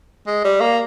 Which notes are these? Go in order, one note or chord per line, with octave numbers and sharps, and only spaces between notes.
G#3
G3
A#3